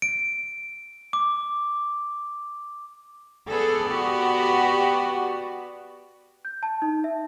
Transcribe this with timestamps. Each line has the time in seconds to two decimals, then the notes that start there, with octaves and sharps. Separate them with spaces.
0.02 D7
1.13 D6
3.50 B3 G#4 A4 D5
3.90 F#4 G4
6.45 G6
6.63 A5
6.82 D#4
7.04 E5